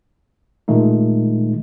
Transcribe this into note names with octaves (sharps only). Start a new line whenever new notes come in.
A#2 D#3 G#3 A3 D#4